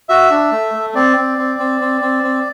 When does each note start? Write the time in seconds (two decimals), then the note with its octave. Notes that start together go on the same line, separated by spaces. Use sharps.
0.09 F#4 E5
0.31 D4
0.52 A3
0.74 A3
0.95 C4 D5
1.17 C4
1.38 C4
1.59 C4
1.81 C4
2.01 C4
2.23 C4